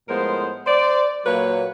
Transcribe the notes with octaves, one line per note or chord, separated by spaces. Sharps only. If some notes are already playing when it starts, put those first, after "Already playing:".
A2 F3 G#3 B3 A#4 C5
C5 D5
A#2 F#3 A#3 B4 C#5